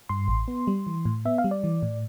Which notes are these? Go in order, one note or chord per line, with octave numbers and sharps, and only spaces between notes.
G2 C6
A1
B3
G3
E3
A2
B3 E5
F5
G3
D5
E3
A2